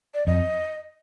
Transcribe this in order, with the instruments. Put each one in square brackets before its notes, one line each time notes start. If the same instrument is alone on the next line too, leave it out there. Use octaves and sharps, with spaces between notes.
[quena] D5
[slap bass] F2 [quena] D#5